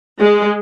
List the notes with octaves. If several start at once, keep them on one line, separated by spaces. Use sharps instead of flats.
G#3